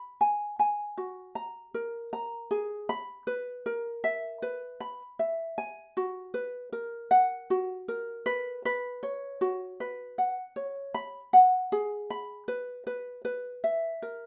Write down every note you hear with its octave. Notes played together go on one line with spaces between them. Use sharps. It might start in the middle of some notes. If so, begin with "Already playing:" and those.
Already playing: B5
G#5
G#5
F#4
A#5
A#4
A#5
G#4
B5
B4
A#4
E5
B4
B5
E5
G#5
F#4
B4
A#4
F#5
F#4
A#4
B4
B4
C#5
F#4
B4
F#5
C#5
B5
F#5
G#4
B5
B4
B4
B4
E5
A#4